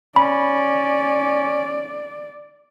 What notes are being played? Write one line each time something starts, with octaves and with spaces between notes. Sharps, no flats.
C#4 D5 B5